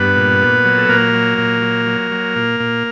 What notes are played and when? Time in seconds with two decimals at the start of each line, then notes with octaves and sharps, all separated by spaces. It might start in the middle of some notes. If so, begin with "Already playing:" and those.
Already playing: G2 B3 B4
0.16 A#2
0.41 A#2
0.65 F#3
0.78 A4
0.89 A#2 A#3 A#4
1.14 F#3
1.38 A#2
1.62 F#3
1.86 F#3
2.11 F#3
2.36 A#2
2.60 A#2